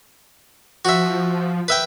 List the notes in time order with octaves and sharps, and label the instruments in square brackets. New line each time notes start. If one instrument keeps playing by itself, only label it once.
[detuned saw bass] F3 [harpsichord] F#4 E5
[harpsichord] B4 E5 G5